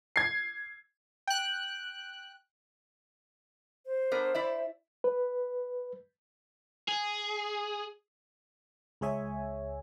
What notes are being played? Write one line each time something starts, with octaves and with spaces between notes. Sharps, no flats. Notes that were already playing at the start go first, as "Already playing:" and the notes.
G#6 C7
G5 F#6
C5
B3 D4 A#4
E4 D5 E5
B4
G#4
C#2 G#3 G#4 C#5 E5 G#5